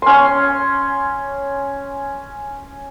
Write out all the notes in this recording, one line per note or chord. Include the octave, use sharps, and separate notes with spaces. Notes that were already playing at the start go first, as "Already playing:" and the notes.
C#4 C6